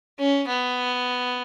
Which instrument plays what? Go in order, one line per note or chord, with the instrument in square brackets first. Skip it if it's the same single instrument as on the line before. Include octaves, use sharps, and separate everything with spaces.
[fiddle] C#4
B3